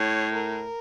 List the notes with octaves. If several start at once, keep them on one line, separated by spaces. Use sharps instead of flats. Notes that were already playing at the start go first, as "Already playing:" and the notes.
Already playing: A2 C#5
A#4